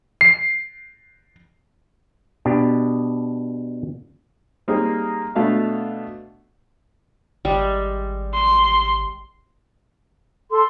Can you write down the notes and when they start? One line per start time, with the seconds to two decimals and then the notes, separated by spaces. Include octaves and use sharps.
0.21 C7
2.45 B2 D4 G4
4.68 G3 A#3 C4 D#4 G#4
5.35 B2 A3 D4 F5 A5
7.45 G#1 G3 G#3
8.34 C6
10.51 A4 C6